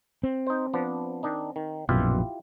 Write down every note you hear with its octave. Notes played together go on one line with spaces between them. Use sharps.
C4
D#4 C5
F3 B3 D4
D#3 D4 D#4
D#3
A#1 F#2 B2 E4 F4 G4